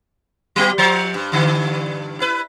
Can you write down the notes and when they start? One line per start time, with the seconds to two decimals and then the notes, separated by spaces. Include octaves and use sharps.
0.56 F#3 B3 G4
0.78 F3 C5
1.14 G2
1.32 G2 D3 E3
2.20 E4 B4